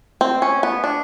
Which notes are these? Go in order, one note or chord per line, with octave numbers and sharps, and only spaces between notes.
C4
C#4
B3
D4